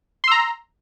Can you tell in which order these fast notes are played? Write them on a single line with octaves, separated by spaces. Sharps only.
C6 E6 A#5